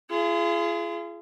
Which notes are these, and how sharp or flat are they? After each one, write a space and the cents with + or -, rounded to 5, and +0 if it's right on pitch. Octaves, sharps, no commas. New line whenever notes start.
F4 -40 G#4 +15